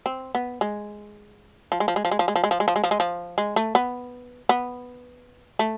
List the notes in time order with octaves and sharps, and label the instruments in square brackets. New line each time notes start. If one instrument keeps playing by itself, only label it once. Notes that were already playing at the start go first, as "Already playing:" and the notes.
[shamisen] C4
B3
G#3
F3
G#3
F3
G#3
F3
G#3
F3
G#3
F3
G#3
F3
G#3
F3
G#3
F3
G#3
F3
G#3
A3
B3
B3
A3